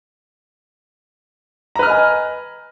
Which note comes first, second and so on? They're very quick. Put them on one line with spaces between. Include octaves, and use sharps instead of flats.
A#5 B4 F6 D#5 G#5